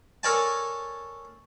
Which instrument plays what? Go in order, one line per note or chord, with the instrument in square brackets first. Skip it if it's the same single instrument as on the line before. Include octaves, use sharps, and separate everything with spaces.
[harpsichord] A4 A#4 C#5 D5 G#5 A5